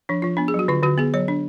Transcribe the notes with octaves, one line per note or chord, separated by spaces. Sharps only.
F3 D4
F3 F4
B3 D4
G#4
F#3 F#4
D3 F4
D3 F#4
B3 G#4
F#3 C#5
D4